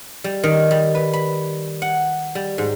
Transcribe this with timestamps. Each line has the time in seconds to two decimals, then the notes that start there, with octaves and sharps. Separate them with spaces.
0.24 G3
0.44 D#3
0.71 G3
0.95 B4
1.13 B5
1.82 F#5
2.35 G3
2.58 G#2